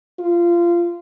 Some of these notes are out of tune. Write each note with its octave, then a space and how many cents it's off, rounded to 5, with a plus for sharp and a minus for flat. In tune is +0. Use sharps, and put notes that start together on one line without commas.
F4 -20